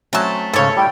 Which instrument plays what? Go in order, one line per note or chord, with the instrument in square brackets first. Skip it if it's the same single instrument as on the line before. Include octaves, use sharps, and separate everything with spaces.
[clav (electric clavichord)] F#3 C4 C#4 [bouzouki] A3 A5
[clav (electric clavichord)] G#2 C#3 [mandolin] A4 C#5
[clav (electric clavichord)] G3 E4 [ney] G5